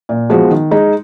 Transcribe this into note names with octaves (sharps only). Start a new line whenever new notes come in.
A#2
F3 G#3 B3 F#4
D#3
G#3 D#4